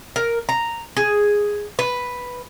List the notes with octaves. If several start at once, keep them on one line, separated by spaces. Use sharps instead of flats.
A#4
A#5
G#4
B4